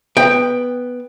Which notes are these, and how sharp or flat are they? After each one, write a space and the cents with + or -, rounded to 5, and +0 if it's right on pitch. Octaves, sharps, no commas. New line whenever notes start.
B3 +0 G5 +10